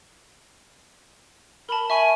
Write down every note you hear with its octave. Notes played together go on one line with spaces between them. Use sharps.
A#4 A5 B5
E5 G#5 C#6